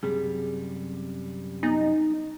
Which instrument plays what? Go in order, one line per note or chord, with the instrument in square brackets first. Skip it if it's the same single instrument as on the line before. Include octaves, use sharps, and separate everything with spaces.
[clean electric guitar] F#2 C3 G3 [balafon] G#4
[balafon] B3 [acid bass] D#4